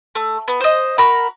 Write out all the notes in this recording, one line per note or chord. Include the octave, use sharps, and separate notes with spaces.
A3
B3
C5 D#5
F#4 A#4 A#5 B5